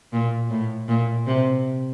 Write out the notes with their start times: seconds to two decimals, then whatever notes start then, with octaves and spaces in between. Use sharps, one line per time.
0.12 A#2
0.50 A2
0.88 A#2
1.27 C3